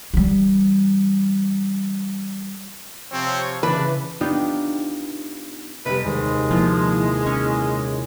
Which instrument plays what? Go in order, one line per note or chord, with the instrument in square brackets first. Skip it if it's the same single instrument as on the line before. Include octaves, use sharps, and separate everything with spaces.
[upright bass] E3 G3
[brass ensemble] C3 F3 C#5 [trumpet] C4
[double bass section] C#3 E3 [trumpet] D4 [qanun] B4
[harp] B3 D4 D#4 F4 G4
[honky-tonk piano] F1 G3 [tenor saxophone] B4 [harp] D#5
[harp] D#2 C3 [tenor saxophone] G#3
[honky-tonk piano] A#2 E3 [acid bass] F3
[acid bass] C#4